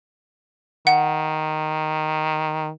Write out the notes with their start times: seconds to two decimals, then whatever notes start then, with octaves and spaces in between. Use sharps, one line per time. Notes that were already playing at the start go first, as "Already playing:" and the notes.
0.87 D#3 F#5